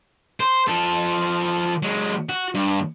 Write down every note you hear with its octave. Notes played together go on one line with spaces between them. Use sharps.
C5
F3 A4
F#3 G#3
F#4
G2